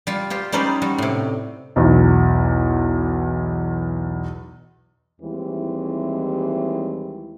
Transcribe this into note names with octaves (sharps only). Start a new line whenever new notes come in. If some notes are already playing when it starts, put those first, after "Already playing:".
G3 F4
F4 G4 C5
G3 C#4 D#4 B4 C5 D5
G3 F#4
A2 C3
B1 E2
D#2 E3 G3 G#3 C4 E4